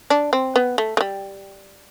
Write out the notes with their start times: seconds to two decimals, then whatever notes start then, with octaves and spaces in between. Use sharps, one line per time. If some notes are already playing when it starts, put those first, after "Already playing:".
0.10 D4
0.33 C4
0.56 B3
0.78 A3
0.97 A3
1.01 G3